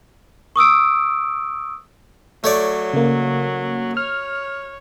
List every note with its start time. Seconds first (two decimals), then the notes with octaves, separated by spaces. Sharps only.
0.56 C#6 D#6 E6 D7
2.44 F#3 A3 C#5 D5
2.93 C#3 A#3
3.97 C#5 F6